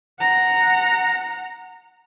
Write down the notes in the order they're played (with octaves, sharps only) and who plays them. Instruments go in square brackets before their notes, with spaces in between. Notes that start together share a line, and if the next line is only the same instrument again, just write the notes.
[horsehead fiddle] F#5 A#5